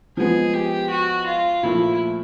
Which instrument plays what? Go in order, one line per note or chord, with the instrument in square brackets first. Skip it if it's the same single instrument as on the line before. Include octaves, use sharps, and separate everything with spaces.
[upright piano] F3 G#3 B3 [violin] G#4
[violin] G4
F#4
F4
[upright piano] A#2 F3 A3 [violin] E4